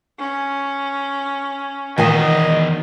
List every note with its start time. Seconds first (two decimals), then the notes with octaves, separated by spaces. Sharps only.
0.19 C#4
1.98 E2 B2 D#3 D5 D#5 G#5